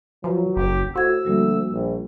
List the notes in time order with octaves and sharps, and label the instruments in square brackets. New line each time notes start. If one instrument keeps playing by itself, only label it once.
[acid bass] F3 [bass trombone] F#3 [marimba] B4 C#5 A#5
[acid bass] F#1 [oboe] G4
[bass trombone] A2 [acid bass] F#4 [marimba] C5 G#6 [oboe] E6
[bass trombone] D2 [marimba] F3 G3 A#3
[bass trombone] A#1